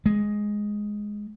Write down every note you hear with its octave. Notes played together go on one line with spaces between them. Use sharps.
G#3